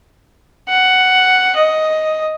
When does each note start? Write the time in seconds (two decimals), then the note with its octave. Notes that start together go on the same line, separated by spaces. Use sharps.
0.69 F#5
1.56 D#5